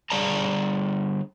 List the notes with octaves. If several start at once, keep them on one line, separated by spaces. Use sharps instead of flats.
D3 G3 G#4 D5 A5 A#5